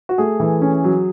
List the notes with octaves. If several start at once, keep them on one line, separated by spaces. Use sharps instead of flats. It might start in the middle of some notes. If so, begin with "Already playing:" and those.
F#4
A3 G#4
E3
C#4
F#3